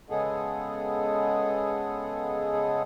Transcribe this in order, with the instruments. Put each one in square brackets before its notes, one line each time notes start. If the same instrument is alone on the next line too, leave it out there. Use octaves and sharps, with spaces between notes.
[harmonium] C#3 G#3 B3 G#4 A4